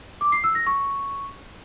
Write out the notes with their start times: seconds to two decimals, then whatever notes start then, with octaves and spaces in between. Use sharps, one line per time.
0.21 D6
0.32 C7
0.44 E6
0.55 A#6
0.67 C#6